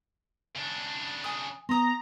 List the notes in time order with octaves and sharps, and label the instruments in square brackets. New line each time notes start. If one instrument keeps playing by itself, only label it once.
[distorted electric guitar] C#3 D4
[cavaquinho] G#5 D#6
[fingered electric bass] B3 [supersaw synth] A#5 [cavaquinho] C6 D#6